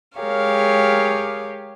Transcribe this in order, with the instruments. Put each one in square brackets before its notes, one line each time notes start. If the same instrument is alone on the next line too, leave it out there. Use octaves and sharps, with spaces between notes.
[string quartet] G#3 G4 G#4 A#4 C#5 F5